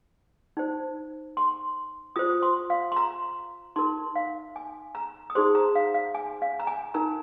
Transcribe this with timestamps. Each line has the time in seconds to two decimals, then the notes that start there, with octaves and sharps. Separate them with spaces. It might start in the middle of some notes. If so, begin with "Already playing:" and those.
0.57 D#4 C5
1.37 C6
2.16 F4 C5 D#6
2.43 C6
2.70 F5
2.92 C6
2.97 A#5
3.76 D#4 A#4 C6
4.16 F5
4.56 G#5
4.95 A#5
5.30 D#6
5.35 D#4 G#4 C5 C6
5.55 A#5
5.75 F5
5.94 F5
6.15 G#5
6.42 F5
6.60 A#5
6.67 G#5
6.94 D#4 A#4 A#5